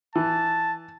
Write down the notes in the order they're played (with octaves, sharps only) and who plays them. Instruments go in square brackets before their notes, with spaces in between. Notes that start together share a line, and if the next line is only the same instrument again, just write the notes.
[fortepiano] E3 [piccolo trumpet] A5